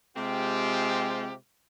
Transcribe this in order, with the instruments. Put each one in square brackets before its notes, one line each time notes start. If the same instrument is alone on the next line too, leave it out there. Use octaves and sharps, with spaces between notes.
[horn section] C3 G#3 C4 F4 G4